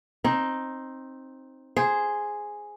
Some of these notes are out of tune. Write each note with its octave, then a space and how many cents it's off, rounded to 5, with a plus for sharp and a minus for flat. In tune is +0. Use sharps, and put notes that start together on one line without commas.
C4 +15 D#4 +0
G#4 +0 C5 +0